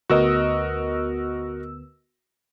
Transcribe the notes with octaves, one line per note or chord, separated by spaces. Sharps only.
D2 B3 F#4 A#4 D#5 E6